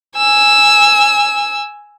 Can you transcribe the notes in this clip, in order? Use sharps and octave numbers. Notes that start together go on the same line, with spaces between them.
G#5 E6